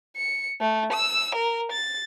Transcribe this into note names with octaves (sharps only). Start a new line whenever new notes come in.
C#7
A3
E6
A#4
A6